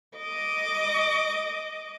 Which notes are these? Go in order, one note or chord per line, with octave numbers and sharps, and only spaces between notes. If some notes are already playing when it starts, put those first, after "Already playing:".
D#5 D6